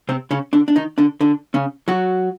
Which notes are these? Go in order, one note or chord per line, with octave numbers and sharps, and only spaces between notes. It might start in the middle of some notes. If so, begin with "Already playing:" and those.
C3 C4
C#3 C#4
D3 D4
D4
D#3 D#4
D3 D4
D3 D4
C#3 C#4
F#3 F#4